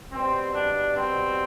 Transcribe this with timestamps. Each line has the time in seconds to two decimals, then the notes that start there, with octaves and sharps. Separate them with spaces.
0.12 B2 G3 C4
0.54 D4
0.96 C4